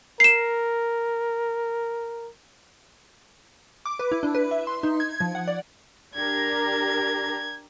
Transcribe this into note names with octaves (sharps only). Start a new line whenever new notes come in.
A#4 C7 E7
D6
B4
E4
D4
B4
E5
C6
D#4
G#6
F3
F#5
D5
D4 G4 A#4 G#6